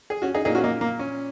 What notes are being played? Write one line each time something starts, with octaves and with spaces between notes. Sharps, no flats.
G#4
C#4 F#4
D#4 G#4
A#2 A#3 D#4 G#4
C#4 F#4
A#3 D#4
A#3
C#4